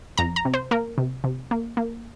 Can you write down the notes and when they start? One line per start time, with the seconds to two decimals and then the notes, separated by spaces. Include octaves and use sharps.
0.18 F2 A#5
0.36 A#5
0.45 C3
0.54 C5
0.71 A#3 A#4
0.98 C3
1.24 C3
1.51 A#3
1.77 A#3